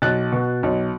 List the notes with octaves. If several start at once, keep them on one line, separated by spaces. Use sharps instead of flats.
B1 F#6 A6
B2
B1